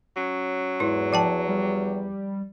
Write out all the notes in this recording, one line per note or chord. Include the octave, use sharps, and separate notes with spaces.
F#3 C#4
E2 G#2 E4
F3 G5 A5
G3